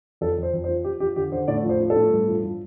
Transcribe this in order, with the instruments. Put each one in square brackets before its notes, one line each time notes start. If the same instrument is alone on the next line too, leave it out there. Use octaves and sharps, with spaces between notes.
[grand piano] F2 A4
F2
C5
F2
C5
F3
F3 G4
F3 G4
D3 G4
D3 C5
A2 D5
F3
C5
F3
A4
A2
G2
F3
F3